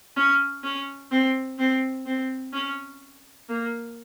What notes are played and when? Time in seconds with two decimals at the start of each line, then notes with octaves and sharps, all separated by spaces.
0.16 C#4
0.63 C#4
1.11 C4
1.58 C4
2.06 C4
2.53 C#4
3.49 A#3